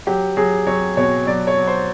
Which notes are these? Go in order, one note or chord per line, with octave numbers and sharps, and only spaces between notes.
F#3 G4
F#3 G#4
F#3 C#5
B2 C#5
F#3 D5
C#5
F#3
C5